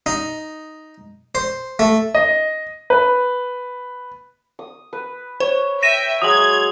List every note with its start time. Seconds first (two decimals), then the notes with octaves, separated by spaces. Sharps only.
0.06 D#4
1.35 C5
1.79 A3
2.15 D#5
2.90 B4
4.59 D#6
4.93 B4
5.40 C5 C#5
5.83 E5 G5 A#6 D#7 E7
6.22 F#3 G#3 D#6 G#6 F#7